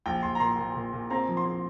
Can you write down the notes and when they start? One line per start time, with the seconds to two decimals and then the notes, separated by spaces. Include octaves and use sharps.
0.06 A#1 G5
0.23 A#1 C6
0.35 A#5
0.40 A#2 C6
0.58 A#2
0.75 A#2
0.93 A#2
1.10 C4 A#5
1.28 F3
1.37 C6
1.45 C4